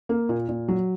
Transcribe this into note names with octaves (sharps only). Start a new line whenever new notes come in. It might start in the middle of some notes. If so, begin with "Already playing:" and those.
A#3
A#2
A#2
F#3